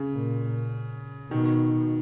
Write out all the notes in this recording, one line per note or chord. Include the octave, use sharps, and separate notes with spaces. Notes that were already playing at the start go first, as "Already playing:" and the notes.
Already playing: C#3
A#2
B2 D#3